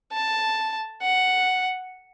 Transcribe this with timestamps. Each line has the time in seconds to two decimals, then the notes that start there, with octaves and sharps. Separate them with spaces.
0.13 A5
1.02 F#5